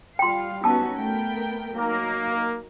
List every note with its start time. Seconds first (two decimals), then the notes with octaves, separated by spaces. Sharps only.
0.19 G3 F4 F5 G5 C6
0.64 B3 C#4 D#4 F#4 A5 E6
0.97 A3 B3 A#4 G5
1.76 F#3 A#3 D#4 A#4